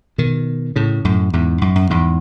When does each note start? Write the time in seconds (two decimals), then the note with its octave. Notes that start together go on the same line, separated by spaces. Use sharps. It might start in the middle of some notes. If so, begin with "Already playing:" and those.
0.18 B2 D#3
0.76 A2 C#3
1.05 F#2 A2
1.33 E2 G#2
1.61 F#2
1.75 F#2
1.90 E2 G#2